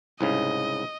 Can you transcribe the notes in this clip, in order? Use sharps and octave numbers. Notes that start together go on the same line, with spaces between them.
C2 G#2 C#3 D#5